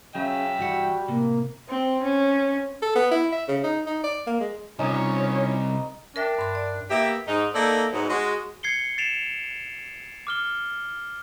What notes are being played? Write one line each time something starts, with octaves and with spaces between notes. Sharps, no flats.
C#3 F#3 C#4 E5 G5
G2 E3 G3 F#4 F#5
A2 C3 A#3
C4
C#4
A4
B3
E4
E5
C#3
D#4
D#4
D5
A#3
G#3
C2 C#4 D#4 F4 C#5
D4 A#4 E5 G5
G2 C6
D5
A#3 B3 G4 E5
G#2 D#4
A#3 D#4 A4 D5 E5
G#2 F#3 B3 D#4
G#3 F#4
G#6 C7 C#7 G7
A6 C7 D7 E7 F7
D6 F6 G7